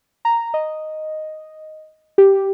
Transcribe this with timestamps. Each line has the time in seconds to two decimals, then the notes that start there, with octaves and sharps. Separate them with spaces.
0.25 A#5
0.54 D#5
2.18 G4